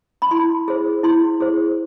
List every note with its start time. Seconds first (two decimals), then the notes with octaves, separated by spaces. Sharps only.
0.22 B5
0.31 E4 C6
0.68 G#4 C5
1.03 E4 C6
1.40 G#4 C5